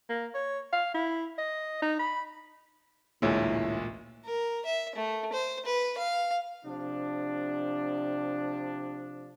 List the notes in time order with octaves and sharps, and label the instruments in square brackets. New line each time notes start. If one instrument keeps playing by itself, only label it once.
[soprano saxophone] A#3
C#5
F5
E4
D#5
D#4
B5
[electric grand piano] A1 D2 G#3 [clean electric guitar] A#2 [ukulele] E4 C#5
[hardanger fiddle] A#4
E5
A3
C5
B4
F5
[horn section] C3 F3 D4